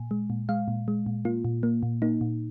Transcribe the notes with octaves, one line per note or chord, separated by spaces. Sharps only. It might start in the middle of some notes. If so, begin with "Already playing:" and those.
Already playing: A#2 G#5
G#3
A#2
G#3 F5
A#2
G#3
A#2
A#3 F4
A#2
A#3
A#2
A#3 D#4
A#2